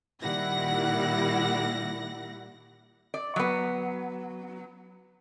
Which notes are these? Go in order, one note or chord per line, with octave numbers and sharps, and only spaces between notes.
A#2 D#3 G3 E4 F#5 A#6
D5
F#3 B3